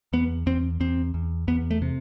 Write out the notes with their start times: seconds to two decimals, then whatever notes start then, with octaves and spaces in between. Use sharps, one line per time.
0.13 E2 B3
0.46 E2 C4
0.80 E2 C4
1.14 E2
1.48 E2 B3
1.71 A3
1.82 C3